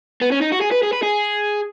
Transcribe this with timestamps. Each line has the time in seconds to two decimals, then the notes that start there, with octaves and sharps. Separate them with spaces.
0.22 B3
0.32 C#4
0.42 D#4
0.52 F#4
0.61 G#4
0.72 B4
0.83 G#4
0.93 B4
1.03 G#4